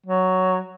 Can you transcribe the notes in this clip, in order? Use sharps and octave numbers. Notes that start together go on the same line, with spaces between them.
F#3